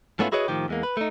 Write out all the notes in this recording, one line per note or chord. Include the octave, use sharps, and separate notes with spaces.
G#2 A3 B3 C#4 E4 F4
E4 F#4 G#4 B4 C#5 D#5
A2 D#3 F3 G4
E2 G#3 A#3
B4
A3 D#4